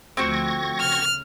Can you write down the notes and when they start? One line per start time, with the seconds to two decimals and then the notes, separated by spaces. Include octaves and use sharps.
0.17 D2 F3 A3 C4 F#4 C#6 G#6 A#6
0.80 C#3 F6